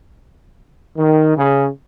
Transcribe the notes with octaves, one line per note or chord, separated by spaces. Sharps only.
D#3
C#3